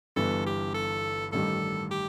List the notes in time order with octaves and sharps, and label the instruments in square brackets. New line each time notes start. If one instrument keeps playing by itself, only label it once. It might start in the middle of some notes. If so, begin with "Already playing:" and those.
[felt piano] G1 G2 E3 B3 [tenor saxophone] A4
[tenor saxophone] G4
A4
[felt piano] A1 G2 D#3 G3 [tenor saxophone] A4
[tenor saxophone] G4